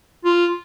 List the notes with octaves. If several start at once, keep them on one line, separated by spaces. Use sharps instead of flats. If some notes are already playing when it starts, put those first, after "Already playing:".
F4